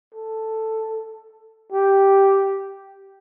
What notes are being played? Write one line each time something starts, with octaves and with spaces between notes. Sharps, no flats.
A4
G4